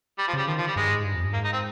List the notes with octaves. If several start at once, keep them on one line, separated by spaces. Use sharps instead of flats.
G3
F3
C#3 G3
D#3 F3
F3
G3
G2 G#3
G#2
G2
F2
G2
G#2 A#3
D#4
C4